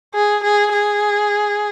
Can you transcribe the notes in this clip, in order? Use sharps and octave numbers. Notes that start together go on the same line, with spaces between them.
G#4
G#4
G#4